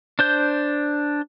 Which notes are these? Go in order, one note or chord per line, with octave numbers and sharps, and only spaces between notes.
D4 C5 G6